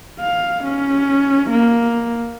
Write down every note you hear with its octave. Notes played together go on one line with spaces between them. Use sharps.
F5
C#4
A#3